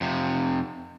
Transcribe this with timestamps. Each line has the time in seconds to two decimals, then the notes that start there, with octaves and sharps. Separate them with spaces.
0.01 F2 C3